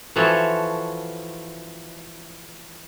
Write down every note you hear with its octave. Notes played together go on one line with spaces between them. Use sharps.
E3 F3 F#4 A4 C#5